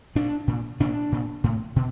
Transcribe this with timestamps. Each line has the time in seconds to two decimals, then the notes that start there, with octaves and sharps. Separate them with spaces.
0.15 A#2 D4
0.48 A#2
0.80 A#2 D4
1.12 A#2
1.44 A2
1.76 B2